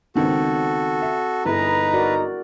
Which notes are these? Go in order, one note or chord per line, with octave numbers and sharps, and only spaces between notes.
C#2 D#3 B3 C4 F#4 A4
E5
G1 D#4 E4 G#4 B4 A#5
F#4 A#4 D5